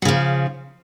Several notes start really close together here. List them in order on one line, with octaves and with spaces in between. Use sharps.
F#3 C#3 F3